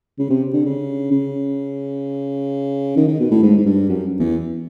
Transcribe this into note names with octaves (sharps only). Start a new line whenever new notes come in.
C#3
C3
D3
C#3
C#3
D#3
D#3
B2
A2
G#2
G#2
G2
F#2
E2